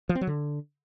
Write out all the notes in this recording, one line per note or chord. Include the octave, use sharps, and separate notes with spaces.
F3
C4
F#3
D3